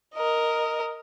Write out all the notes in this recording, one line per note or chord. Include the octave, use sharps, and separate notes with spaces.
A#4 D#5